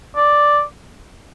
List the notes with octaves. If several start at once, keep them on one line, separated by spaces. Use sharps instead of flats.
D5